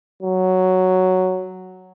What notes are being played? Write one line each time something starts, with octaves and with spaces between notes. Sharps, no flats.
F#3